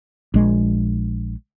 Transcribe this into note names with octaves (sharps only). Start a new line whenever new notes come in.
A#1 G#3